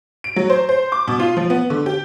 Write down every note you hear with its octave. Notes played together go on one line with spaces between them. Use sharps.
D7
F#3
C5
C5
D6
B2
F4
F3
B3
D3
G4